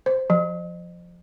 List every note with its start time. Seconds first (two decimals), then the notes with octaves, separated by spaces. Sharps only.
0.06 C5
0.30 F3